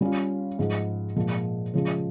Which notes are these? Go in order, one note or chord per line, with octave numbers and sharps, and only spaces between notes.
G3 C#4 F4
G#2 F3 G#3
A#2 F3 G#3
C#3 F3 G#3